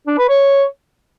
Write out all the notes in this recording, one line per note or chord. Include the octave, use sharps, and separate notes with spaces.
D4
B4
C#5